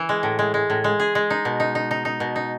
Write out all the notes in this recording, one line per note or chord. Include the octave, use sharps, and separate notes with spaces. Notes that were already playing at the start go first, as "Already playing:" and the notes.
Already playing: E3
G#3
A2
G#3
G#3
A2
G#3
G#4
G#3
D#4
B2
D#4
D#4
D#4
D#4
B2
D#4